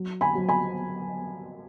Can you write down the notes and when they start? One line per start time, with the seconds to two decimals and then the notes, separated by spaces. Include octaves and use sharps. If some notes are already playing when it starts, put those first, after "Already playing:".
Already playing: F#3
0.21 G#5 B5
0.35 F#3
0.49 G#5 B5